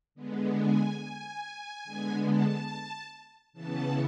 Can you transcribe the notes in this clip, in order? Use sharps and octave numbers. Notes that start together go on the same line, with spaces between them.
D3 G#3 B3
G#5
G#5
D3 G#3 B3
A5
C#3 E3 B3 A5